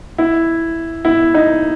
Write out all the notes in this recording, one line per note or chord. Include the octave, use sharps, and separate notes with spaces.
E4
E4
D#4